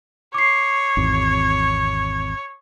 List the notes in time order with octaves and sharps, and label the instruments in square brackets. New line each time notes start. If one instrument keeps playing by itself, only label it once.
[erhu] C#5 [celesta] D6 C7
[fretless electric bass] G#1 E2 C4